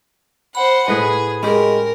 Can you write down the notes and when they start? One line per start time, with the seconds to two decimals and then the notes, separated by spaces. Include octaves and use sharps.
0.55 C5 F#5 B5
0.88 A2 G#4 B4 D#5
1.43 G#3 C#4 G4 A#4